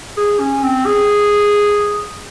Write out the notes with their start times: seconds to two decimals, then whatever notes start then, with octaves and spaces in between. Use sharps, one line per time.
0.17 G#4
0.40 C#4
0.63 C4
0.86 G#4